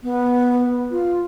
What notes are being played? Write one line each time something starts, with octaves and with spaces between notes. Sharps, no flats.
B3
F4